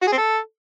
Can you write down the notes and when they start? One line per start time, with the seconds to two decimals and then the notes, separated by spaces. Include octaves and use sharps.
0.02 F#4
0.07 G#4
0.12 C4
0.17 A4